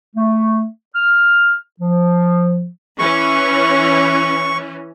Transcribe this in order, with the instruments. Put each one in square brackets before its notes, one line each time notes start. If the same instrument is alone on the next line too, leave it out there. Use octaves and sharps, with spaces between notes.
[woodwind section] A3
F6
F3
[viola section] E3 C#4 [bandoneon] C#6